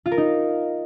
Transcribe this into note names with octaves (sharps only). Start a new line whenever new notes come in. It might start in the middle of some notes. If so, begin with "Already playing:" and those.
F4
A#4
D#4